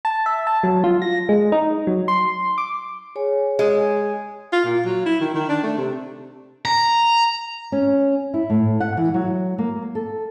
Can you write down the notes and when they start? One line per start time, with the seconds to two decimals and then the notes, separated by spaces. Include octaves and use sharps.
0.05 A5
0.26 E5
0.47 A5
0.63 F#3
0.84 F4
1.02 A#6
1.29 G#3
1.52 D#4
1.87 F#3
2.08 C6
2.58 D6
3.15 G#4 C#5 G#5
3.59 G#3
4.53 F4
4.65 A#2
4.85 F#3
5.06 E4
5.21 D#3
5.35 D#3
5.49 D4
5.63 A3
5.78 C3
6.65 A#5
7.72 C#4
8.34 E4
8.50 A2
8.80 F#5
8.97 E3
9.14 F#3
9.58 A#3
9.95 A4